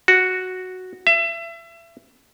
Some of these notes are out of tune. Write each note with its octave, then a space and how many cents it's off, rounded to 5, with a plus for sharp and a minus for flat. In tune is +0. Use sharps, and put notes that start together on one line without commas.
F#4 +0
E5 +30